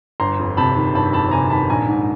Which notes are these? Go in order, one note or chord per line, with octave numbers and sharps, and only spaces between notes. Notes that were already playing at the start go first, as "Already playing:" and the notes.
G1 A#5 C6
F2
C3 A5 B5
D#3
G1 A5 B5
F2 A5 B5
C3 G#5 A#5
D#3 A5 B5
A#1 G#5 A#5
G#2